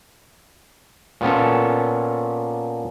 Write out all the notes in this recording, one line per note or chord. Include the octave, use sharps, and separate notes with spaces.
A#2 B3 C#4 A4